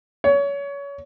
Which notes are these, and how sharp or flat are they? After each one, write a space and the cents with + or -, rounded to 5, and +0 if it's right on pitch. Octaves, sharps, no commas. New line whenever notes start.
C#5 +25